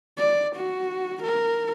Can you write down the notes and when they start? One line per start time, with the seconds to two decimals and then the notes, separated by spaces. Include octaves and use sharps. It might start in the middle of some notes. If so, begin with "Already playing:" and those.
0.18 D5
0.56 F#4
1.23 A#4